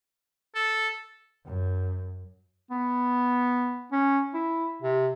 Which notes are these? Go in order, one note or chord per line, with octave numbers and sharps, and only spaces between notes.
A4
F#2
B3
C#4
E4
C3